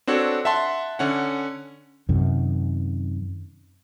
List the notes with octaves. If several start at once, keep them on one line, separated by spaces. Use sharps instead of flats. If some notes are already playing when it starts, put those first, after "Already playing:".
C4 D4 F#4 A4 C#5
E5 F#5 A5 C6
D3 C#4 F#5
F#2 C3 D#3